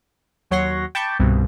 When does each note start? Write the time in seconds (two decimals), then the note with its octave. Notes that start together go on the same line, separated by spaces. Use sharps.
0.51 D#2 F#3 C#5 F#5 C6 A#6
0.95 G5 A5 B5 C#6 D6 G6
1.19 C2 G2 B2